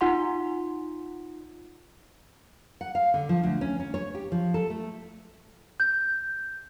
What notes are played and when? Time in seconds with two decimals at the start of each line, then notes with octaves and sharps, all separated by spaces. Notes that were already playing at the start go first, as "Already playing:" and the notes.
0.01 D#4 F4 F#5 C6
2.81 F#5
2.95 F5
3.14 D3
3.29 F3
3.43 D2
3.61 C#4
3.80 C#4
3.94 C#5
4.15 G4
4.32 F3
4.54 A4
4.70 A3
5.80 G6